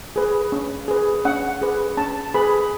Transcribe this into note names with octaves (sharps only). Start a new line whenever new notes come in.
G#4 B4
C#4
G#4 B4
C#4 F#5
G#4 B4
C#4 A5
G#4 B4 B5